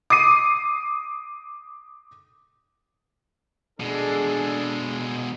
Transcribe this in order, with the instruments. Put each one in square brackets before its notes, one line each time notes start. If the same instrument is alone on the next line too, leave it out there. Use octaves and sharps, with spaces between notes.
[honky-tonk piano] D6 D#6 C7 D#7
[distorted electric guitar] B2 G#3 [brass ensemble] D4 G#4 A4